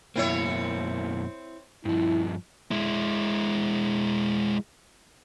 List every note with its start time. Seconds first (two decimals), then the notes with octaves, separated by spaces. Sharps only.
0.16 F#2 B2 A#3 C4 E4 C#5
1.85 G2 F3 E4
2.71 G#3 E4